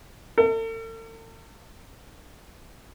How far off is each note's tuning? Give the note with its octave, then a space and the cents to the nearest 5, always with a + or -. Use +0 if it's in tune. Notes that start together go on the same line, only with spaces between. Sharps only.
A4 +45